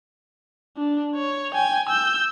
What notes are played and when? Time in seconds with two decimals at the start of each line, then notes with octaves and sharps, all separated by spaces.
0.77 D4
1.15 C#5
1.54 G5 G#5
1.89 E6 G6